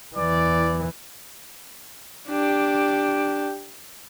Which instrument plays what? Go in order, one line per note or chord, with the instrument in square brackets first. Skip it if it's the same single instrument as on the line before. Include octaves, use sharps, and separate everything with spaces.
[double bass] E2 E3 [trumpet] D5
[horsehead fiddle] D4 G4